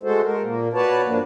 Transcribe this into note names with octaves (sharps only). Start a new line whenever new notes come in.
G#3 A3 F#4 A4 C5
A#4
A#2 A#3
F#4 B4 C#5 D5 A5
G2 F3 A#3 D4